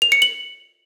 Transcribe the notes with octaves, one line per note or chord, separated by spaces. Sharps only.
F7
C#7
F#7